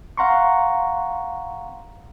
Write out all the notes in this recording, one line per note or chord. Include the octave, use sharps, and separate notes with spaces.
F5 F#5 A#5 C6 C#6